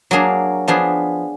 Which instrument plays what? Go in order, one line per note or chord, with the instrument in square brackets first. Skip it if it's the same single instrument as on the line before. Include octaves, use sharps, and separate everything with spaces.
[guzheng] F#3 A#3 D4 G#4
F3 B3 D4 G#4